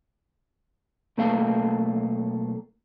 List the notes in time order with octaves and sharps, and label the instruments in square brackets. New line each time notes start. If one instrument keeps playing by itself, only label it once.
[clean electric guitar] B1 A3 A#3 A4 F5